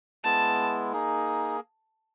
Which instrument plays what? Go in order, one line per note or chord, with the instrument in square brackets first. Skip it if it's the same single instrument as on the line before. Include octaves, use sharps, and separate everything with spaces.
[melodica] G#3 B3 E4 [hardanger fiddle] A5
[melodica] A#3 D#4 G#4